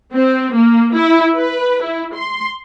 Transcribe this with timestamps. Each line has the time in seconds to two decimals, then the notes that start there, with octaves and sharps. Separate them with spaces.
0.13 C4
0.54 A#3
0.94 E4
1.35 B4
1.83 E4
2.15 C6